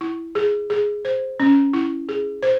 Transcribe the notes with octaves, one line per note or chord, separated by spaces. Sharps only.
E4
G#4
G#4
C5
C#4
E4
G#4
C5